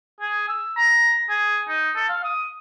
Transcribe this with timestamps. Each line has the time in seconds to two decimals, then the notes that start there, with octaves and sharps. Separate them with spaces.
0.21 G#4
0.49 E6
0.77 A#5
1.30 G#4
1.69 D#4
1.96 A4
2.10 F5
2.24 D#6